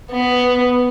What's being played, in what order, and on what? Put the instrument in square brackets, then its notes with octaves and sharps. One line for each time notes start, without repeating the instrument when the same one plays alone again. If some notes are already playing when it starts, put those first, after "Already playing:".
[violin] B3